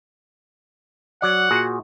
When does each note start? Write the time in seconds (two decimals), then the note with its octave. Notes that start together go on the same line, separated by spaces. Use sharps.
1.22 F#3 D5 F#5
1.51 A#2 F#4 G#4